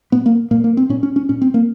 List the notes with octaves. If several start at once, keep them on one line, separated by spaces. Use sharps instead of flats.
A#2 B3
A#3
A#2 A#3
A#3
C4
A#2 C#4
C#4
C#4
A#2 C#4
C4
A#3